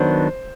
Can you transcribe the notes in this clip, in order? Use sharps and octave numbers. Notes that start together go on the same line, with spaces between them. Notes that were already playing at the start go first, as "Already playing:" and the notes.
Already playing: D#3 F#3 B3 D4 C5